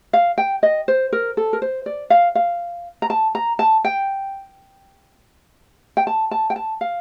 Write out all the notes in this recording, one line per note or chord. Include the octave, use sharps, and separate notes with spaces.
F5
G5
D#5
C5
A#4
A4
A#4
C5
D5
F5
F5
A#5
A5
A#5
A5
G5
G5
A5
A5
G5
A5
F5